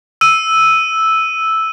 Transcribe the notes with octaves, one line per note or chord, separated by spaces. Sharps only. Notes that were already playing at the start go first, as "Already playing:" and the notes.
E6 D#7